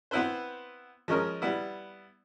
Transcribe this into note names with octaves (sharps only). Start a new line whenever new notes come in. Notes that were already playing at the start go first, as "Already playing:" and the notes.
B3 C4 E4 B4 C5
F3 G#3 C#4 A#4 D#5
G3 B3 E4